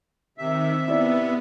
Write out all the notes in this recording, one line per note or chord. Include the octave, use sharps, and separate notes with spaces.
C3 D#3 E5
B3 E4 D5